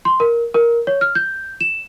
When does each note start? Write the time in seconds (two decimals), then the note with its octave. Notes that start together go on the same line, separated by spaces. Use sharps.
0.05 C6
0.20 A#4
0.54 A#4
0.87 C#5
1.01 F6
1.15 G6
1.61 E7